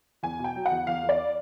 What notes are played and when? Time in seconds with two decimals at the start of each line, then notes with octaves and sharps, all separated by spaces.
0.23 E2 G#5
0.39 B2
0.44 G5
0.56 F#3
0.66 F#5
0.71 E2
0.87 E2 F5
1.03 E2
1.09 D5